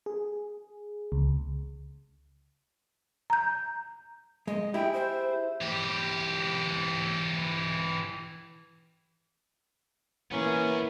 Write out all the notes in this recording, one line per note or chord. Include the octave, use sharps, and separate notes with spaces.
G#4
C#2
A#5 G6
G#3 D#5
E4 G4 G#4 G5
C5
E3 G4
E3 A#3 B3 C#4 G#4